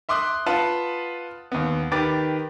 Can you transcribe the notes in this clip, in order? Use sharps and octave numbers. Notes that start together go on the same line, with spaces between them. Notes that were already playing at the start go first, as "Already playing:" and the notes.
E5 C6 D6 D#6 F#6
F4 B4 F#5 A5
D#2 B3
D#3 G4 B4 D6 A6